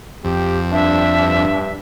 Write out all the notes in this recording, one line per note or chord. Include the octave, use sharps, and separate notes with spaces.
F2 G4
G2 D4 E5
G2